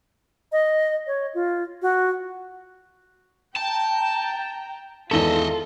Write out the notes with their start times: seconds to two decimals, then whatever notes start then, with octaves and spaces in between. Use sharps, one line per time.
0.52 D#5
1.07 C#5
1.35 F4
1.82 F#4
3.56 G5 A5 A#5
5.11 G#1 E2 F4 A4 D#5 E5 G7